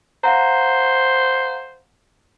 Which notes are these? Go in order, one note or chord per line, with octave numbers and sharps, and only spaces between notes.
C5 F5 F#5 A#5